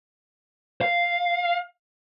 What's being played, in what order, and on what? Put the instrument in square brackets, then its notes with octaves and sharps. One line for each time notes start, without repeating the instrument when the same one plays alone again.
[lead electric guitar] F5